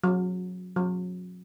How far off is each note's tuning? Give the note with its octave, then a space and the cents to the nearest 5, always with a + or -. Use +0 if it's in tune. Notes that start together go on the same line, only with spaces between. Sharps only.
F#3 -25
F#3 -35